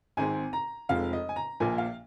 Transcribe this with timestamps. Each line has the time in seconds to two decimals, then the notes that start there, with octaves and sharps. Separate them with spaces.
0.17 G#1 G#2 G#3 C4 G#5
0.53 A#5
0.89 F1 F2 F3 G#3 F5
1.13 D#5
1.29 G#5
1.36 A#5
1.60 A#1 A#2 F3 A#3 G#5
1.78 F5